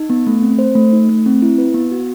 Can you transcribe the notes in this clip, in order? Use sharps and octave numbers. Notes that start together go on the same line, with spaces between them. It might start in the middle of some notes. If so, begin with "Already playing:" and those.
Already playing: D#4
B3
A3
C4
C5
A3
D#4
A3
C4
E4
B4
B3
F#4